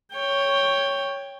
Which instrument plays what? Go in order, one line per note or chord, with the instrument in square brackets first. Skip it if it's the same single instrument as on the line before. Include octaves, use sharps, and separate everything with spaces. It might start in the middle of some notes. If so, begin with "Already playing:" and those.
[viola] C#5 G5